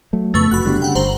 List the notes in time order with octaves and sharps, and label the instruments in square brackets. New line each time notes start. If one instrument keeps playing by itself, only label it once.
[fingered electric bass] F#3 A3
[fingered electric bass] F2 C#3 B3 [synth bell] A3 B4 C#6
[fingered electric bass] F1 [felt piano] F#4 [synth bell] B5 F#6
[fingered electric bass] F#1 A3 B3 [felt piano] D3 G3
[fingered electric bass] C#3 [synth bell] F#5 G5
[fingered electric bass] G1 [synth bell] C5 A#5 F#7